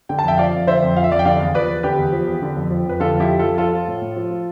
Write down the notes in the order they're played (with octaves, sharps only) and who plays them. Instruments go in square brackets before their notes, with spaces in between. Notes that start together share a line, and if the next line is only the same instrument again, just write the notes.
[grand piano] D3 G5
A5
F2 E5 G5
F3 D5 F5
F2
D3 C5 E5
F2
F3 F5
E5
F2 D5 F5
G5
D3 D5 F5
E2
F3 B4 D5
E2
D3 G4 B4
E2
F3
E2
D3
F2
F3
F2 B4
D3 F4 A4
F2
E4 G4
F3
F2 F4 A4
F3 F4 A4
F3
A2
A2
F3
F3